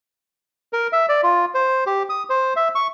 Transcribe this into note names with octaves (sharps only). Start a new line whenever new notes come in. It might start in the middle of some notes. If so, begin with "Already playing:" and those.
A#4
E5
D5
F4
C5
G4
D#6
C5
E5
C#6